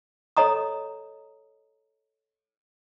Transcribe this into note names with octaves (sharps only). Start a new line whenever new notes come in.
A4 C#5 D#5 A#5 D#6